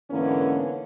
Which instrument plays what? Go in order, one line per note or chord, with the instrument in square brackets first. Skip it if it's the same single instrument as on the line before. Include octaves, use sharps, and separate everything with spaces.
[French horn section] G#2 D3 E3 A#3 B3 C#4